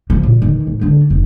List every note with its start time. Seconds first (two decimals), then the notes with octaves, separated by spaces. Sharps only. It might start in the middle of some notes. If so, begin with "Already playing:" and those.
0.10 F3 F#3
0.23 A#2
0.42 D#3 E3
0.67 A2
0.81 D3 D4
1.10 F1